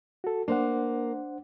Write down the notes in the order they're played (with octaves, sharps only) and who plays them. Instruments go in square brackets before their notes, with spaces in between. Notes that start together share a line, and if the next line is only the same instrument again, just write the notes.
[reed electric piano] F#4 A4
[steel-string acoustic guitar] A#3 [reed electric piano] D4 C5 F#5